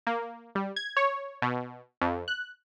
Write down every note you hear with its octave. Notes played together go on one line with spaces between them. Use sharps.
A#3
G3
G#6
C#5
B2
F2
F#6